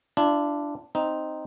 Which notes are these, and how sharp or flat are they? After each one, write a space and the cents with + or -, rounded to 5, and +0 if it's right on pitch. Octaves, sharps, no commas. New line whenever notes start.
D4 +0 F4 -45
C4 +0 D#4 +0